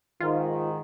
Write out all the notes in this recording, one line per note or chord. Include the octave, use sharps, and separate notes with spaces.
G#2 D#3 F4